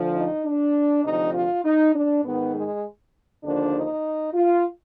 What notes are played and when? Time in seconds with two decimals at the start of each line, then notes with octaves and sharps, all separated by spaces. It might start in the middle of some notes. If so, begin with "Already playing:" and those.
Already playing: D2 D3 F3
0.15 D#4
0.44 D4
1.03 D2 C3 F3 D#4
1.34 F4
1.64 D#4
1.94 D4
2.23 G#2 D#3 B3
2.53 G#3
3.43 D#2 D3 F3 D4
3.74 D#4
4.34 F4